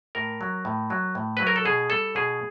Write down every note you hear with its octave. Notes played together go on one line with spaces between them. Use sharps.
A2 A#4
F#3
A2
F#3
A2
F#3 B4
A#4
A4
B2 G#4
G3 A4
B2 G#4